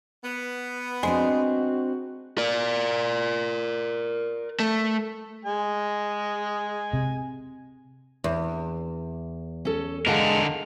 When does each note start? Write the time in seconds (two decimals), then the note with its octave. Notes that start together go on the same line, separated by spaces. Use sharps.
0.23 B3
1.03 G#3 C4 D4 F#4 C5
2.38 A#4 D5
4.60 A3
5.45 G#3 G#5
6.93 C3
8.24 E2
9.65 C#4 A4
10.07 D3 G#3 A#4 F5 F#5 A5